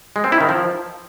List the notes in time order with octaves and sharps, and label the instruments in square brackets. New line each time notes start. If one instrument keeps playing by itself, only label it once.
[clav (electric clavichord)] G#3
C4
E4
D#3
F3